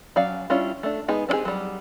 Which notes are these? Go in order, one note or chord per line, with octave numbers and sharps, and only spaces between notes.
F#3 C#4 D5 F5
G3 C#4 D4 E4 F4
A3 D4
G#3 B3 D#4 G#4
C4 D4 D#4 G4 G#4
F#3 G3